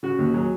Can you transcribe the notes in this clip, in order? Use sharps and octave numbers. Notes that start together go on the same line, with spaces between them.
C#3 F#4
D#2
F#3 G#4